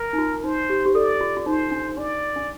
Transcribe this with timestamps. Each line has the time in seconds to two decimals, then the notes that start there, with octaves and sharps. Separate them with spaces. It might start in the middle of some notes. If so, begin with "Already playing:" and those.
Already playing: A#4
0.13 D#4
0.18 F4
0.44 D#4 C5
0.70 G4
0.86 G4
0.95 A4 D5
1.21 F4
1.37 F4
1.46 D#4 C5
1.71 D4
1.97 D4 D5
2.36 D4